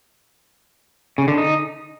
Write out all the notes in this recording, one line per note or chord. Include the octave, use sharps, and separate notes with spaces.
C#3
D3
D#4